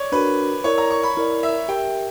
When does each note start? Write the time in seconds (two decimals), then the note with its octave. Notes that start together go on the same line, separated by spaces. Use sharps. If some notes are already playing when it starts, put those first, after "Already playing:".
Already playing: C#5 D5
0.12 D4 F#4 A#4 B4
0.64 E4 A#4 C#5 D5
0.78 A#5
0.91 C#6
1.03 B5
1.17 E4 A#4 D5
1.43 E5
1.68 G4 A#4 E5 G5